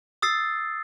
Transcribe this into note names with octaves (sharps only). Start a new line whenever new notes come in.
D#6 E6 A6 C7